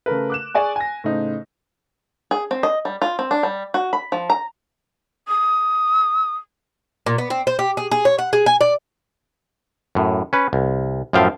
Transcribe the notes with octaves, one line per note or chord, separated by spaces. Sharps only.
C#3 A3 A#4 B4
D6 F#6 E7
G#4 D5 G#5 C#6
G#5 A#6
A2 C#3 D#4 C5
G#4
C4
D#5
G3
F4
C4
D4
G3
F#4
B5
F3
A#5
D#6
A#2
B3
C4
C5
G4
G#4
G#4
C#5
F#5
G#4
G#5
D5
F#2 A2
C#4 B4
C2
F#2 A2 F3 E5 F5 G5